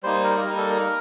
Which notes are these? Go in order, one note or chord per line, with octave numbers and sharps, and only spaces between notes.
G3 A#3 D#4 C5
A#4
G3 A#3 D#4 A#4
A4
A#4